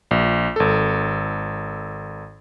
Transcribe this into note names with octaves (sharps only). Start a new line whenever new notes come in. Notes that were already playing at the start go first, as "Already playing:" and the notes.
A#1
G#1 A4